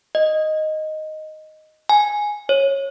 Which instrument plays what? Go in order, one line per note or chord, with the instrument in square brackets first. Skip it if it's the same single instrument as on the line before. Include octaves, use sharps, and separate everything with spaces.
[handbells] D#5
G#5
C#5